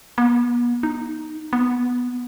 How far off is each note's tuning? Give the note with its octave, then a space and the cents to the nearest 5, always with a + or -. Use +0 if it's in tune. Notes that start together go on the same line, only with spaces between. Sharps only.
B3 -40
D#4 -5
B3 -5